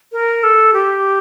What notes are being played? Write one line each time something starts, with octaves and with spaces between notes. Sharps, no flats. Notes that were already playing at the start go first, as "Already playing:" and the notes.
A#4
A4
G4